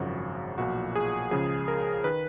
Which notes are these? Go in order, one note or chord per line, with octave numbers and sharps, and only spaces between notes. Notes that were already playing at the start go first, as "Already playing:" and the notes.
Already playing: G#1 F#2 C#3 F3 F#4
B1 A#2 F3 F#4
G#4
C#2 C#3 F3 G#4
A#4
D#3 B4